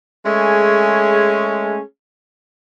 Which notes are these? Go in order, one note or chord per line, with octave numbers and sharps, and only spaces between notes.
G#3 A3 C#4 G#4